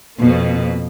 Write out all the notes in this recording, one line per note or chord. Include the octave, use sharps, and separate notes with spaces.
F2 B2 A#3